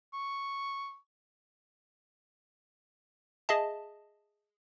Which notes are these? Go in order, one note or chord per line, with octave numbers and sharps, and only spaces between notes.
C#6
G#4 D#5 E5 A5